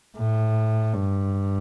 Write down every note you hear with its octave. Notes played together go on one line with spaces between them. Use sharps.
A2
G2